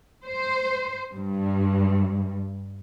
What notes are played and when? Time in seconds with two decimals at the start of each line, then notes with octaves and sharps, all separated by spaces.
0.25 C5
1.15 G2